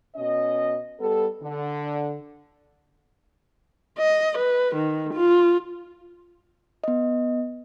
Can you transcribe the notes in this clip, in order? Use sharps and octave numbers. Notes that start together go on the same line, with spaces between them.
B2 C#4 D#5
G3 B3 A4
D3
D#5
B4
D#3
F4
B3 D#5